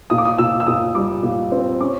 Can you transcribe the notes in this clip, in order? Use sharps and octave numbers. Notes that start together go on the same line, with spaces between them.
A#2 D#6
D6
D#6
A#2 E6
E6
A#2 D#6
G3 D6
A#2
C4
C#4 D6